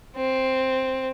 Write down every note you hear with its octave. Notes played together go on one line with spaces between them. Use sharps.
C4